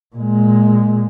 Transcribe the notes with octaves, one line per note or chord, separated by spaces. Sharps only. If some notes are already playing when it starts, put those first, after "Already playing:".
A#2 G#3